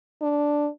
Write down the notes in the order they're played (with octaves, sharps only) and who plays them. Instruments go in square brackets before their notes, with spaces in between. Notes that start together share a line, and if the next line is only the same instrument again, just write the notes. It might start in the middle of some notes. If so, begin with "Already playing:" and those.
[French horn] D4